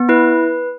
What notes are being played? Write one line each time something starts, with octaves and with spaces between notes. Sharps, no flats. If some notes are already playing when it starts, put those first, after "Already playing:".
Already playing: B3
E4 B4